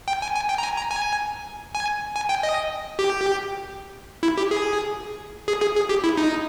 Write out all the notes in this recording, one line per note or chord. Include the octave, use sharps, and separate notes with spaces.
G5
G#5
G#5
G5
A#5
G#5
A#5
G#5
G#5
G#5
G5
D#5
G4
E4
G4
G#4
G#4
G#4
G#4
G4
E4
D#4